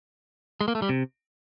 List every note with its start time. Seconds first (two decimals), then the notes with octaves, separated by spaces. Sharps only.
0.61 G#3
0.68 A#3
0.75 A3
0.82 G3
0.89 C3